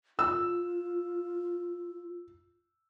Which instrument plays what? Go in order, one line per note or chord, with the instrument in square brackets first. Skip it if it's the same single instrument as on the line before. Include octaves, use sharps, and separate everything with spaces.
[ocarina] F4 [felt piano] E6